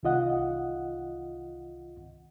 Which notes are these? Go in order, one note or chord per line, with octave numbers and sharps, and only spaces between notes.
C2 D#3 F4 D#5 F#5